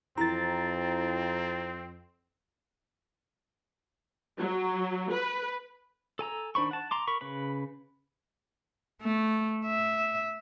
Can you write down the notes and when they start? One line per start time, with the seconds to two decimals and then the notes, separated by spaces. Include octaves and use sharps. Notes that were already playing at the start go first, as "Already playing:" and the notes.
0.18 F2 E3 C4 A#5 A6
4.39 F#3
5.12 B4
6.19 A4 G#5 A#5 E6
6.55 D#3 D4 C5 B5 C#6
6.71 F#5 A5
6.91 A#5 C6 D6
7.08 A#4 B5 C#6
7.21 C#3 B4 B5
9.02 A3
9.66 E5